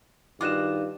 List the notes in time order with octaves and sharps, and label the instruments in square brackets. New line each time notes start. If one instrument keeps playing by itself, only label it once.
[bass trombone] G2 [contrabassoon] D#3 [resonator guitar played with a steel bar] F4 F#4 D#5 [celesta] D6 F#6 E7